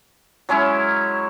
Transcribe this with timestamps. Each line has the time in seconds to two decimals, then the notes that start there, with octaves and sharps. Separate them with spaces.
0.49 F#3 G#3 C#4 E4